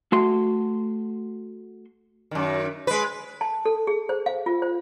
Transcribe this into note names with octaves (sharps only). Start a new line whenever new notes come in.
A3 F#4 C6
F#2 D#3
G#3 B4
A5
A4
G#4
C5
F5
F4
C5